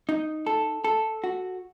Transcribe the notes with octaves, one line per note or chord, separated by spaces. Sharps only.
D#4
A4
A4
F#4